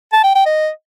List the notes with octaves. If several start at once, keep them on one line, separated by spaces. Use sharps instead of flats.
A5
G5
G5
D#5